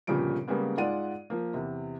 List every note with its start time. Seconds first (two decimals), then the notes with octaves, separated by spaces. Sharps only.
0.07 G1 A#2 C#3 F3 G3 D7
0.48 C#3 G3 G#3 A#3 B3
0.77 G#2 G#3 F4 D5 F#5 D#7
1.30 F3 A#3
1.54 E2 C3